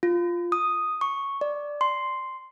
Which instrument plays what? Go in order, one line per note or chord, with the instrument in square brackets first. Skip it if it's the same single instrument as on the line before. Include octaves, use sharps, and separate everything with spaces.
[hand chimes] F4
D#6
C#6
D5
C6